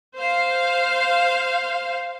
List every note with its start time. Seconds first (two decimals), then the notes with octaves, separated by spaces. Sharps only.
0.17 C5 F5